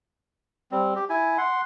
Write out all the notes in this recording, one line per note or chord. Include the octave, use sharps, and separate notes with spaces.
G3 C4
G4
E4 G#5
F#5 C6